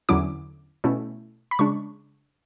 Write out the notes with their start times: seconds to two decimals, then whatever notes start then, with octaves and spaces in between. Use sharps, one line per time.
0.09 E2 D3 F#3 C#4 E4 D6
0.84 B2 A3 C#4 E4
1.51 B5
1.59 C#3 G#3 D4 C#6